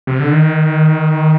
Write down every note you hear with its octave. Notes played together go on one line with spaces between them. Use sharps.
C3
D3
D#3